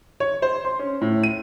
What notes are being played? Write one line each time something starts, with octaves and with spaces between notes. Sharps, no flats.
C#5
C5
C6
C#4
A2
D#7